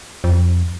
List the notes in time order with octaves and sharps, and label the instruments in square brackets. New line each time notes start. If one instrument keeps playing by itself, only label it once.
[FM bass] F2